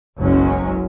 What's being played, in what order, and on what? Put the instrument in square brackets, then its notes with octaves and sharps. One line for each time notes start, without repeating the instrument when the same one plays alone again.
[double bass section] F#1 B1 F#3 G#3 C#4